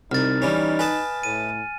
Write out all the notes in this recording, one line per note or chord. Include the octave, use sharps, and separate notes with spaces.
C2 D#4 F6 A6
E3 G3 C#4
B4 D#5 G#5 A5
A2 D#7